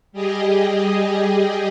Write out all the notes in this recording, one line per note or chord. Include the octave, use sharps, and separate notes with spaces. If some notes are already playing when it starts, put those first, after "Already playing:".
G3 G4 G#4 D#5